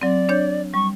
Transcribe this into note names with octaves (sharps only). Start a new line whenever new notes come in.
F#3 C4 D5
D4 C#5 G6
G3 C#6